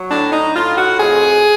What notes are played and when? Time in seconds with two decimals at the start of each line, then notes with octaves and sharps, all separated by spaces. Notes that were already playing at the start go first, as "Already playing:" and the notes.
Already playing: F#3
0.10 A2 D4
0.32 D#4
0.54 A2 F4
0.77 F#4
0.99 F2 G#4